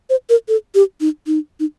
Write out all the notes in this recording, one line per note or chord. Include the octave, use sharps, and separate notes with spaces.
C5
A#4
A4
G4
D#4
D#4
D#4